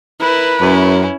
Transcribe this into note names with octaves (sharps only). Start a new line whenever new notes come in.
E4 A#4 B4
F#2 C#4 E4